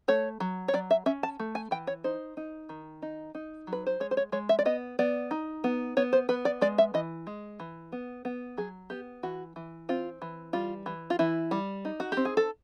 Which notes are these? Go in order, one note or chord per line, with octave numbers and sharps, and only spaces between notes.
A3 C#5
F#3
C#5
F#3 D5
E5
C#4 E5
A5
A3
G#5
E3 G5
C#5
D#4 C5
D#4
D#3
D#4
D#4
F#3
B4
C5
G#3 C#5
C5
C#5
G#3 C#5
E5
D5
B3 D#5
B3 D5
D#4
B3
B3 C#5
C5
B3 B4
D5
G#3 D5
E5
E3 D#5
G#3
E3
B3
B3
F#3 G#4
B3 G4
E3 F#4
E3
C4 F4
E3
G3 F4
E3
F4
E3 E4
G3
D#4
F#4
C4 G4
G#4
A4